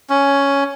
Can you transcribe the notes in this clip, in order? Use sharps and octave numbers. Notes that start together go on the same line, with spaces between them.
C#4